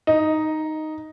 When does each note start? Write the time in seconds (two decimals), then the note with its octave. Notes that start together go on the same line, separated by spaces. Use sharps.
0.07 D#4